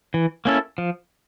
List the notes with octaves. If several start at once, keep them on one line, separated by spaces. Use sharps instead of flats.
E3
A#3 C#4 E4 A4
F3